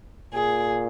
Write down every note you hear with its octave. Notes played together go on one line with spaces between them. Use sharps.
A#2 G#4